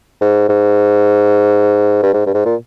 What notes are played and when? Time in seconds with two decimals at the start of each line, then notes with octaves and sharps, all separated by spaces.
0.21 G#2
0.49 G#2
2.03 G2
2.13 G#2
2.26 G2
2.34 G#2
2.45 A#2